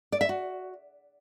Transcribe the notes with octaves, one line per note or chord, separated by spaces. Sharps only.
D5
E5
F#4